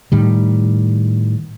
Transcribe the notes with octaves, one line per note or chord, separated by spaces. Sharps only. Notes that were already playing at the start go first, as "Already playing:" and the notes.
A2 D#3 G3